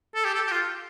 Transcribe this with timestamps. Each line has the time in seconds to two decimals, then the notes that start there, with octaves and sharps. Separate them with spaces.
0.15 A4
0.25 G4
0.34 A4
0.47 G4
0.51 F4